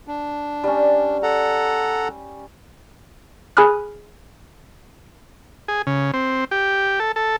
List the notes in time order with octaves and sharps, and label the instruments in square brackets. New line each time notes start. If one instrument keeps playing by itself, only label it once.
[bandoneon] D4
[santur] G3 C#4
[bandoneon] A4 F#5 A#5
[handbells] G#4 G#5 B5 D#6 F6 F#6
[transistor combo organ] G#4
C#3
C4
G4
A4
A4